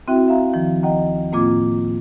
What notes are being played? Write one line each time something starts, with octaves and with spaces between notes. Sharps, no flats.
C4 E4 F#4 E5 G5
E5 F5 A#5
D#3 F3
D#2 D#5 F#5 G5 A#5
A2 A#3 C4 F4 D6 G#6